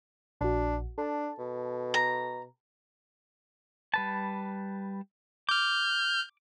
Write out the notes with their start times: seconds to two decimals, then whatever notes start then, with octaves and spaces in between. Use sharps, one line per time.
0.41 A#1 D4 F#4
0.98 D4 A4 A5
1.39 B2
1.94 A#5
3.94 G3 B4 A5
5.49 D6 F6 G6